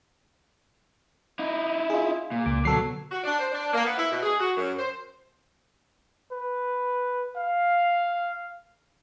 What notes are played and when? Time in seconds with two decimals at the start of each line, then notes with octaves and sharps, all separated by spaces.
1.39 D#4 E4
1.90 F4 G#4
2.32 A#2
2.46 C#2 D6
2.65 B2 D3 F#3 A4 C7
3.12 F#4
3.24 D4
3.39 C5
3.52 D4
3.73 A#3
3.85 B3
3.97 E4
4.11 B2
4.23 G#4
4.39 F#4
4.56 F#2
4.77 C5
6.32 B4
7.36 F5